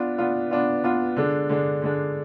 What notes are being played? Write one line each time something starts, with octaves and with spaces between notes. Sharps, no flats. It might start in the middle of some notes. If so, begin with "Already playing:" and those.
Already playing: B3 D4 F4
B3 D4 F4
B3 D4 F4
B3 D4 F4
D3 G#3 D4
D3 G#3 D4
D3 G#3 D4